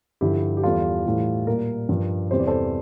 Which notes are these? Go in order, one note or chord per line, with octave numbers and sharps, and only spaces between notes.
G2 D3 F3 E4 G4
G4
E2 E3 G3 F4 A4
A2 E3 G3
A#2 G3 G4 A#4
G2 F3
E2 C3 G3 C5
D5
A4 C5